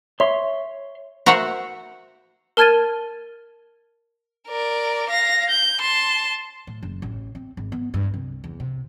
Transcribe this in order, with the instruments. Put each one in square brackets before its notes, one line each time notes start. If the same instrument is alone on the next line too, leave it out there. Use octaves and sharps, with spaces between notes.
[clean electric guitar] C#5 C6 [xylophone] E5
[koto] F#4 A#4 C5 E5 F#5
[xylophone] A#4 A5 F6 G#6 A6 D#7
[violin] A#4 D5
F5 A#6
G6
A5 C6
[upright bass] A2
F#1
A1
C4
G#1
B3
G2
C2
E2
C3